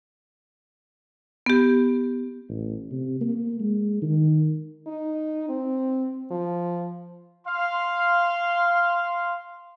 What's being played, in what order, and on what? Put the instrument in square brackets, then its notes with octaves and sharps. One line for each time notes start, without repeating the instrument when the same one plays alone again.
[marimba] B3 G4
[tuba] A1
C3
A#3
G#3
D#3
[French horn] D#4
C4
F3
[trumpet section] F5 C6